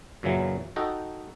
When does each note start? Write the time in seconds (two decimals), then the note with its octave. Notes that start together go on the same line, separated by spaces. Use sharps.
0.23 F#2 A#2 C#3 E3 F#3
0.76 D#4 F#4 A4 D#5 G5